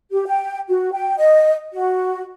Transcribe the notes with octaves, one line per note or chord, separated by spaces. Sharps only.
G4
G5
F#4
G5
D#5
F#4